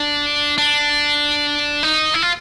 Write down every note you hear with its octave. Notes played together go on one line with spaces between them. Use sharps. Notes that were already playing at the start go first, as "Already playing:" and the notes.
Already playing: D4
D4
D#4
E4
F4